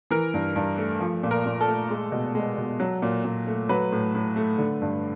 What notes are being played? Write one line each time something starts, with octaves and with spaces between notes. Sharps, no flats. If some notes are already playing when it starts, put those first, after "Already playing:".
E3 A#4
G2
G2
A3
F3
A#2
A#4
A#2
A4
A3
G#3
B2
G#3
B2
F#3
A#2
A#2
A3
F#3 B4
A2
A2
A3
D3
G2